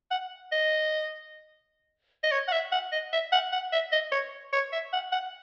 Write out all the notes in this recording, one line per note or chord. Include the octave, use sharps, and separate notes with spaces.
F#5
D#5
D#5
C#5
F#5
E5
F#5
D#5
E5
F#5
F#5
E5
D#5
C#5
C#5
E5
F#5
F#5